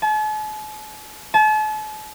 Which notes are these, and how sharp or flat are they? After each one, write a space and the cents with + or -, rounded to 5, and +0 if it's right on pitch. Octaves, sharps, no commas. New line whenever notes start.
A5 -45
A5 -40